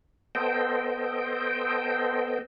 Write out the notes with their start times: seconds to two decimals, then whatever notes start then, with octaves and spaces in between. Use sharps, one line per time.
0.35 B3 A4 C5 D#5 G5